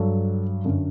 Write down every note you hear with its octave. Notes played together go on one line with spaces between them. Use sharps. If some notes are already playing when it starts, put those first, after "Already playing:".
Already playing: G2 F#3 A4
F#2 D3 F#3